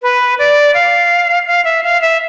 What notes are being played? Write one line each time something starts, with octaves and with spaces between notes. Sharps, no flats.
B4
D5
F5
F5
E5
F5
E5